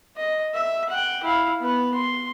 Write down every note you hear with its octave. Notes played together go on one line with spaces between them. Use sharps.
D#5
E5
F#5 G5
E4 F5
B3 B4
C6